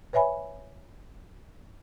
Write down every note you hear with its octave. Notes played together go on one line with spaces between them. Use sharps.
B4 C#5 E5 G#5 B5